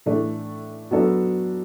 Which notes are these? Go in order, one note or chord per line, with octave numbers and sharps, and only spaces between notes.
A2 E3 A3 D4
F#3 B3 D4 A4